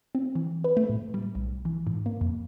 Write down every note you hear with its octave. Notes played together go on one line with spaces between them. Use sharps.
C4
E3
B4
A3
A2
G3
B1
E3
G#2
A#3
F2